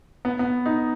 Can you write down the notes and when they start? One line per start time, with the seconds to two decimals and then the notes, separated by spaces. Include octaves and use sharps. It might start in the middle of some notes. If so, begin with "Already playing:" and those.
0.25 B3
0.39 B3
0.66 D#4